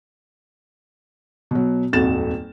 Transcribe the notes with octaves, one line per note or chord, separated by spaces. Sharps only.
B2 F#3
D#1 G#1 F2 F#4 A6 E7